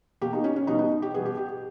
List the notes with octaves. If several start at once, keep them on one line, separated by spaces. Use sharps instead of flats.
B2 A#3 G4
D#4
C#4
C#4
B2 G3 B3 D#4
D#4
G4
B2 G3 B3 G#4
G4
G4